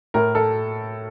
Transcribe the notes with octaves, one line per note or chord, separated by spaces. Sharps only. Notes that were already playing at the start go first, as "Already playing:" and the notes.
A2 A#4
A4